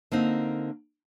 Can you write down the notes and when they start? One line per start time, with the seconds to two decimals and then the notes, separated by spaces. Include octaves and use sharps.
0.11 D3 A#3 C4 D#4